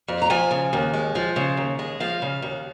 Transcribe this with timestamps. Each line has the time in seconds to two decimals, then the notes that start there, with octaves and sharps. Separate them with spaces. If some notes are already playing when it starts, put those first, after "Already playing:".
0.08 F2
0.22 A#5
0.30 F3 G#5
0.51 C#3
0.73 D#2
0.94 G#3
1.15 F3
1.36 C#3
1.57 D#2
1.79 G#3
2.00 F3 F5
2.22 C#3
2.42 D#2